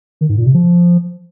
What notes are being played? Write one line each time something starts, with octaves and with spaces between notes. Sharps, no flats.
D#3
G#2
A#2
C3
F3